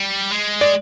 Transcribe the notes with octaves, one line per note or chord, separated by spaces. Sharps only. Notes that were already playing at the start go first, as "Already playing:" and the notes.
Already playing: G3
G#3
D5